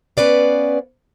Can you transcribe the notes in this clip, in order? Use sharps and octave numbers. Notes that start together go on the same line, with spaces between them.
B3 C#4 B4 D5 F5